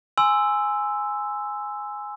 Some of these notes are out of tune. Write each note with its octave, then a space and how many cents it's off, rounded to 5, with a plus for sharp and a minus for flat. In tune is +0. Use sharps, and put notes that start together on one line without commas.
G#5 +0 C6 -15 E6 +0